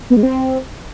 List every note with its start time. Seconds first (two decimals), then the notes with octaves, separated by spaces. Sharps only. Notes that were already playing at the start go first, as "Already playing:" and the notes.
0.10 B3
0.17 G#3
0.23 C4